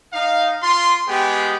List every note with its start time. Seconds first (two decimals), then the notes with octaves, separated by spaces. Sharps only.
0.13 D#4 F5
0.63 F4 C6
1.08 G#3 B3 G4 G#4 G5